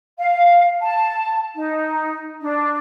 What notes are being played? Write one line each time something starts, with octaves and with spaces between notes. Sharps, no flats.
F5
A5
D#4
D4